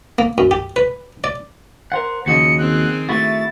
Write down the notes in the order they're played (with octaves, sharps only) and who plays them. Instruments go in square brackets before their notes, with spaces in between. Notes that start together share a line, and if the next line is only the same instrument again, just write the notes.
[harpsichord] A#3
F#2
G4
B4
D5
[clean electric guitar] A#4 C5 F#5
[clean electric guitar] D#2 F#4 D#5 [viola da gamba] C#3 F3 [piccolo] C#7
[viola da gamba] D#3 C4 G#4 [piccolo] F#6
[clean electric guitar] A3 E4 F#4 [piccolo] A6